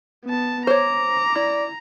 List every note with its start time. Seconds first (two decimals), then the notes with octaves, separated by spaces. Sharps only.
0.25 B3 A5
0.67 C5 C#5 A#5 D6
1.35 E4 D5